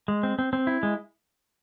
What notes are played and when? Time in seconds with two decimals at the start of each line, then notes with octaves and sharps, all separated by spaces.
0.08 G#3
0.23 C4
0.39 C4
0.53 C4
0.67 E4
0.83 G#3